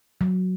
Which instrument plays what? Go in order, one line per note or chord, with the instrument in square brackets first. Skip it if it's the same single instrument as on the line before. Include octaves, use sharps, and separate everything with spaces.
[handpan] F#3